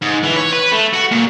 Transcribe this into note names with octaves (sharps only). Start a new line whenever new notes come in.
G#2
E3
C#5
B4
A3
F#4
A#2